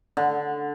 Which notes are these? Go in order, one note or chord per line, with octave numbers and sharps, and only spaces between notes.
D3